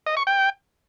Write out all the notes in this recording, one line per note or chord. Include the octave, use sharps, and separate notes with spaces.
D#5
C#6
G5